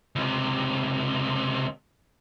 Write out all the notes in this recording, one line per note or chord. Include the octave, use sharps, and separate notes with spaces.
C#2 C3